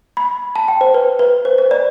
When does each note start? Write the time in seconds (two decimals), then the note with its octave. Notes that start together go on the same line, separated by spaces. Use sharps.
0.17 B5
0.56 A5
0.68 G5
0.81 C5
0.94 B4
1.19 B4
1.45 C5
1.58 C5
1.71 D5